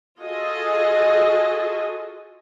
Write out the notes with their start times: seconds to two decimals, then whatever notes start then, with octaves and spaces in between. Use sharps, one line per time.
0.19 F4 F#4 G#4 A4 D#5